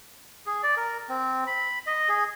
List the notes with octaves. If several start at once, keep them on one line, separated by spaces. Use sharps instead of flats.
G#4
D5
A#4
C4
B5
D#5
G#4